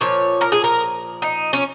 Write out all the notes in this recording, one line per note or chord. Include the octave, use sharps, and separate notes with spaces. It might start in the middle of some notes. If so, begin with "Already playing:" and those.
A#2 F3 C#5
A#4
G#4
A#4
D#4
C#4